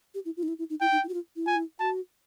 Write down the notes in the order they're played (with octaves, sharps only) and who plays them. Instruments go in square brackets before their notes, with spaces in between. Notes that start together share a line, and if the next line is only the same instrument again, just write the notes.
[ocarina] G4
E4
F4
D#4
E4
E4
D#4
[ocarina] E4 [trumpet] G5
[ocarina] D#4
E4
F#4
F4
E4
[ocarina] F4 [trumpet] G#5
[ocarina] E4
[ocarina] F#4 [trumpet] A5